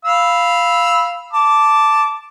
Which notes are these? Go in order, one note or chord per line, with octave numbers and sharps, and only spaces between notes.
F5 B5 E6
A5 D6